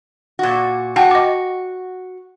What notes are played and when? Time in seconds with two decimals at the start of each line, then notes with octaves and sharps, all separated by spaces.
0.39 A#2 F#4
0.96 F#4 F#5 G5 A5
1.11 D#5 D6